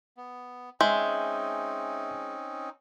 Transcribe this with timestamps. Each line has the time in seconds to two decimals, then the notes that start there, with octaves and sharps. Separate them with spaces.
0.17 B3
0.81 G#3 C4 C#4 D#4 E5 C6 G6